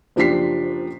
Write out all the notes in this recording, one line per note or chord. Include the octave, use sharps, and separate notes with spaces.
F#1 F3 D4 G4 B6 C7